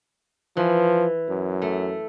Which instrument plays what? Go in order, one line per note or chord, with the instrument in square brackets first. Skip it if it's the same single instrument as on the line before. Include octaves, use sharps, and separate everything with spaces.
[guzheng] E3 [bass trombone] F3
[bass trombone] F#2
[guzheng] A3